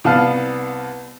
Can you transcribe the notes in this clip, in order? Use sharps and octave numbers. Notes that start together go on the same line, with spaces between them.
C2 B3 F5 A5 F6 C7